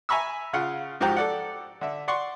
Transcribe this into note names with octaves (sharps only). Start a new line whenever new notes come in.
E5 G#5 A#5 B5 C#6 E6
C#3 F4 F5 F#5
G#2 F3 F#4 G4 A#5
A4 D5 F#5
D3 E5
D5 F#5 C6 C#6